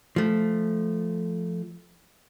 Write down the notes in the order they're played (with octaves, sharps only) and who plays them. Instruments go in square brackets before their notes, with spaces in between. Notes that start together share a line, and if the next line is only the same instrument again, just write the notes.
[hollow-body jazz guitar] F3 A3